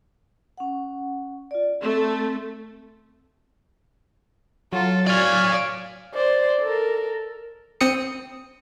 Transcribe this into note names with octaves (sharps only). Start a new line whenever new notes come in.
C#4 F#5
F4 D5
A3 C4
F#3 F4 A4
C#5 D5 F5 G#5
C5 D5
A4 A#4
C4 D#6 C#7